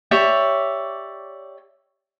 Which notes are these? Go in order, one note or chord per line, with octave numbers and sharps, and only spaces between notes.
G4 C#5 D5 E5